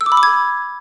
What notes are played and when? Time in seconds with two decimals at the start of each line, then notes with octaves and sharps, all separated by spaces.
0.01 E6
0.06 D6
0.12 B5
0.17 D6
0.23 G#6